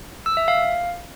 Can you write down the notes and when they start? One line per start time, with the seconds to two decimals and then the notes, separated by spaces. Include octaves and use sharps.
0.26 E6
0.37 E5
0.48 F5